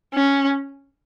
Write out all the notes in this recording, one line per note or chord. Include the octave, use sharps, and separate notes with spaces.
C#4